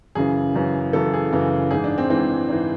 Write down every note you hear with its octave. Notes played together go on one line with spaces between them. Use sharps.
F#2 C#3 E3 G#4
F#2 C#3 E3
F#2 C#3 E3 A4
G#4
F#2 C#3 E3
G#2 E3 G#4
D4
C4
G#2 E3 C4
G#2 E3